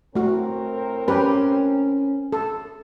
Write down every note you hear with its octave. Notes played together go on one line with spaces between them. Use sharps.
A2 A3 C4 F#4 A#4
C#4 G4 B4
A4